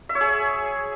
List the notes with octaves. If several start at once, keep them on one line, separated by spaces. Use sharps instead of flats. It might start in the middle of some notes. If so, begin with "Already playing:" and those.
E5
C#5
G#4